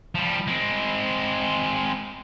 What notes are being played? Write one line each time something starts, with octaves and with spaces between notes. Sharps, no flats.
F3 G3
G#3 C4